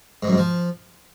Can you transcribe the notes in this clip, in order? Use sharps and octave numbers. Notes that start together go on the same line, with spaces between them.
G#2
F#2
G#2
F3